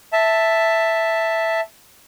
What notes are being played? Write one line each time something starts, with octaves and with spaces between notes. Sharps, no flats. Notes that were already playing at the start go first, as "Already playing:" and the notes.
E5 A5